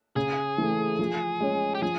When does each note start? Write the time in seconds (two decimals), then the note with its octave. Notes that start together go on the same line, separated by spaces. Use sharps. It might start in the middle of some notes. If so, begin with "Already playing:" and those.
0.16 C#3 G#4
0.58 E3 A3
0.99 F3
1.40 G#3 C#4
1.75 G4
1.82 F3 G#4